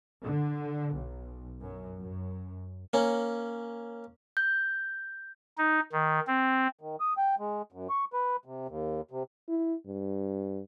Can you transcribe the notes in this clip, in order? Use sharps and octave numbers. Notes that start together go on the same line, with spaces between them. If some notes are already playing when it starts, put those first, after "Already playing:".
D3
B1
F#2
F#2
A#3 C#4
G6
D#4
D#3
C4
D#3
D#6
G5
G#3
F#2
C#6
B4
C3
D#2
C3
E4
G2